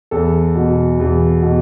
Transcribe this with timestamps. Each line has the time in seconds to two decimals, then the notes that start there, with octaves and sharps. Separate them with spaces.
0.11 E2 A4
0.55 B2
1.00 E2
1.42 B2